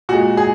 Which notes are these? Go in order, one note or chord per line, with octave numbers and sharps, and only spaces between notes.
A#2 G#3 F#4
G#4